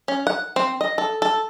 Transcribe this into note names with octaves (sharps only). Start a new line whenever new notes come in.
C#4
F#5
C4
D#5
A4
A4